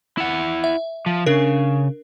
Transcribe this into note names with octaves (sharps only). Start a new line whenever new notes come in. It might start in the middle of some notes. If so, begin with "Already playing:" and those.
E4 F#5
E5
F3
C#3 D4 A#4